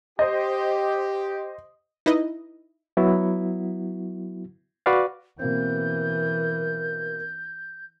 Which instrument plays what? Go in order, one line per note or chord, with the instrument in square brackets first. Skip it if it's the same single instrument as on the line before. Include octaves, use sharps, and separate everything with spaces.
[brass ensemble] G4 [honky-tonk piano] C5 D#5
[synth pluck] D#4 E4 B4 D#5
[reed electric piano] F#3 B3 E4 F#4
F#4 B4 D5 F5
[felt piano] B2 A#3 C4 [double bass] E3 [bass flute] A#4 [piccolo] G6